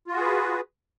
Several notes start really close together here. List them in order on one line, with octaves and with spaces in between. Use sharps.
F4 F#4 G#4 B4